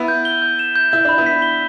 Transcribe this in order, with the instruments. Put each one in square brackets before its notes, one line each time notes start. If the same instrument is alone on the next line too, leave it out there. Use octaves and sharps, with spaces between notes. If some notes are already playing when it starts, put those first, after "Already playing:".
Already playing: [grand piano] B3 E4
[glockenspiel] G6
G7
G6
E7
G6
[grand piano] E4 [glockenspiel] G6
[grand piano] D4 [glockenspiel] B5
[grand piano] B3 E4
[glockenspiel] B6
G7